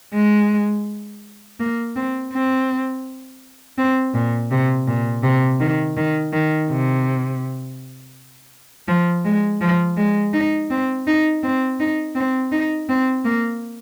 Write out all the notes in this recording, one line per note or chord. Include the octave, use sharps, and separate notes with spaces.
G#3
A#3
C4
C4
C4
A#2
C3
A#2
C3
D#3
D#3
D#3
C3
F3
G#3
F3
G#3
D#4
C4
D#4
C4
D#4
C4
D#4
C4
A#3